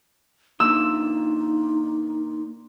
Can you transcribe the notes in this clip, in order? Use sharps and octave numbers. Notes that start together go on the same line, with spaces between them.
A#2 D3 D#4 E6